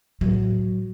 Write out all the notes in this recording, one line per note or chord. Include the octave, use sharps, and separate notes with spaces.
A2 F#3